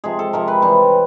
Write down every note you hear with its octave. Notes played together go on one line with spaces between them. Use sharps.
C3 F3 G#3 G#4
A4
C3 F3 G#3 A#4
B4
C3 E3 G3